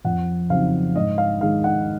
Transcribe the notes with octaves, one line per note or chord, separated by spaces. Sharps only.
F2 F#5
C#3 F#3 C4 D#4 F5
G#2 D#5
F5
D#3 G#3 D#4 F5
F#5